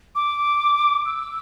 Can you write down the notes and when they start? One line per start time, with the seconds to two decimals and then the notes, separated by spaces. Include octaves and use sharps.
0.15 D6
1.05 E6